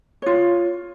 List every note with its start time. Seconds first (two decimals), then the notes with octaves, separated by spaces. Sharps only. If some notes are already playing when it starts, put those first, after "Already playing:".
0.22 F4 C#5